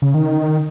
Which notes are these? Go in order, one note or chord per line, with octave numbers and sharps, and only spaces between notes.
C#3
D#3